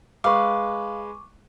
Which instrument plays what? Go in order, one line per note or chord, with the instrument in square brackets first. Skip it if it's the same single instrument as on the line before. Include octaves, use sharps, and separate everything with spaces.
[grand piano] G#3 B4 [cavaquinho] F5 [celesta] C#6 D6